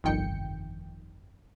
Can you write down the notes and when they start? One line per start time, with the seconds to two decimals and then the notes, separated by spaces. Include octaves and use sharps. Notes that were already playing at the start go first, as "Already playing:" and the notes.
0.04 G1 C2 F2 D#3 G5 C#7